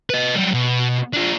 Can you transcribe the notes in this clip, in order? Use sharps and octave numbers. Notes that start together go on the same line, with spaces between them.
B4 D#5
F#3 G3
B2
D4 F4